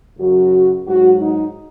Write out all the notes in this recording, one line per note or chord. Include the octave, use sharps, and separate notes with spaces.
F#2 C#3 F#3 F#4
G#2 F#3 F#4
D#4